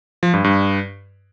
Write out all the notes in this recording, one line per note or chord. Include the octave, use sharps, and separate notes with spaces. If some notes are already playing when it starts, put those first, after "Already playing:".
F3
G2
G2